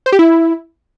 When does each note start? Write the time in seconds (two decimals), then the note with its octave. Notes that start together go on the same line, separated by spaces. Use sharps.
0.06 C5
0.12 G4
0.19 E4